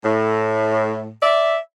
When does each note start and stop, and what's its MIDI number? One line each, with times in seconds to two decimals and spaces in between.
0.05 1.11 45
1.23 1.58 74
1.23 1.58 76